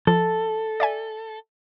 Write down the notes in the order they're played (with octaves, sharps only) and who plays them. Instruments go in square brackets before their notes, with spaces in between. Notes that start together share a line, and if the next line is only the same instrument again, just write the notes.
[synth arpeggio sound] F3 [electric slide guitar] A4
[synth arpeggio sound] D5 E5 G#5